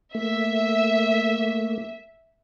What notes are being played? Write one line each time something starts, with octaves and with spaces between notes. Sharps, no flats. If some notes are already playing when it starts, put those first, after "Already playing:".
A3 A#3 E5